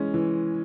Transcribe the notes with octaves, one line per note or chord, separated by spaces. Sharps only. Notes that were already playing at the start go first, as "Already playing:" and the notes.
Already playing: E3 G#3 C#4
E3